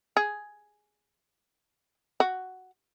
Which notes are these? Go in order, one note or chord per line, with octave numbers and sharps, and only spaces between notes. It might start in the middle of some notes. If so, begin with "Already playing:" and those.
G#4
F#4